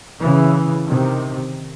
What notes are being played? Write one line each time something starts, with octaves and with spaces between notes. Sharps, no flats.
C#3 E3
C3 D#3